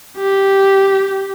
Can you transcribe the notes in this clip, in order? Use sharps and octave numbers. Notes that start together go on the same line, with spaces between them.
G4